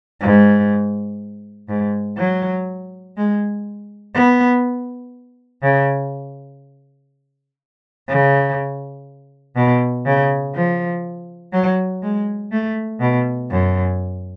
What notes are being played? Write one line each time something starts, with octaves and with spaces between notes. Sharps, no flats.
G#2
G#2
F#3
G#3
B3
C#3
C#3
B2
C#3
F3
F#3
G#3
A3
B2
F#2